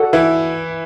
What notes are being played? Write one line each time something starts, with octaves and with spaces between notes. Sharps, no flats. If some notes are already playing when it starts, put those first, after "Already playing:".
Already playing: F#4 A4 D5 F#5
E3 E4